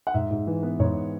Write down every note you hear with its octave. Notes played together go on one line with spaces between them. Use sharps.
F#5
G#2 E5
G#2
E3
B3
G#2 C#5